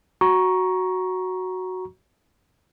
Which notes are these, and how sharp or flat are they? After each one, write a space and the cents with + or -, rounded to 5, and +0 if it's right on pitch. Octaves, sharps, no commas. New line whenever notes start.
F#4 +0 A#5 +15 C#6 +0